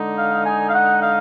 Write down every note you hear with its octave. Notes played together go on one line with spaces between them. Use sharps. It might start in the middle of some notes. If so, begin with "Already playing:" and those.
Already playing: D3 G#3 D#4
F5
G#5
F5
F#5
F5